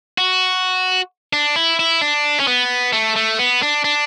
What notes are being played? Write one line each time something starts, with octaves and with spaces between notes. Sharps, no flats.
F#4
D4
E4
E4
D4
C#4
B3
A3
A3
B3
D4
D4